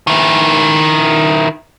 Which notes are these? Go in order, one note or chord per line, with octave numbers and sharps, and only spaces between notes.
D#3 E4